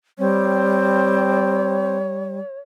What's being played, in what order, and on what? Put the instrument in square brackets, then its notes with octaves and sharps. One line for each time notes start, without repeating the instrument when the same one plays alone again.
[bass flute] G3 [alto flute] C4 [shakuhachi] C#5